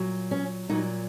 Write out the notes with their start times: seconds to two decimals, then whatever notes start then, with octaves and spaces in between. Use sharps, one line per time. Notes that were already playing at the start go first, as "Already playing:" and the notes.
Already playing: A#2 F#3
0.31 C#4
0.69 A#2 F#3 D#4